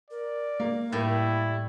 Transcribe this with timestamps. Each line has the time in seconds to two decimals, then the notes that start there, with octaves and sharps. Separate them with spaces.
0.11 A#4 D5
0.60 A#3
0.92 A2 G3 E4